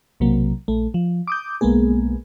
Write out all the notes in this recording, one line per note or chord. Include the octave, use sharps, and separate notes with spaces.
B1 C3 F#3 A#3
A#1 A3
F3
D6 D#6 G6
B1 G#3 A#3 B3 G#4